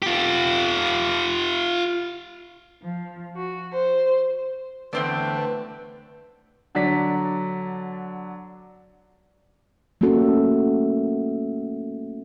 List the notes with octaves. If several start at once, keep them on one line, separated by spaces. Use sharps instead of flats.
F4 G4
F3
F#4
C5
E2 D3 A3 C4 B4 D5
D3 F#3 D4 D5 B6
A3 A#3 C#4 F#4 A4